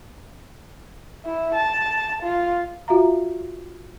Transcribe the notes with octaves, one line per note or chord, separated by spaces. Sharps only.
E4
A5
F4
F4 F#4 E5 F5 A#5